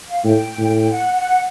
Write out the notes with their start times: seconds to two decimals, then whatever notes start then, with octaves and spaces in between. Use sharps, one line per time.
0.08 F5
0.24 A2 G5
0.58 A2
0.92 F#5
1.15 F#5